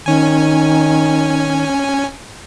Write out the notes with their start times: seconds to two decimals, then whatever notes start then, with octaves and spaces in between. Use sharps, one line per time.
0.06 D#3 C#4 G#5